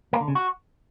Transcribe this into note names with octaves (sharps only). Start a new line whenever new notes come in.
A#3
D3
C#3
F#4